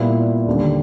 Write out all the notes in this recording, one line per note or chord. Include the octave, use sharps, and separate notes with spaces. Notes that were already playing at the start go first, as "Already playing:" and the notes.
Already playing: A#2 G3 B3 E4
D#2 D3 G3